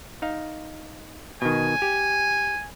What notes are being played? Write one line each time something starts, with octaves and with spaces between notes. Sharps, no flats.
D#4 F5
B2 D#3 G#5
G4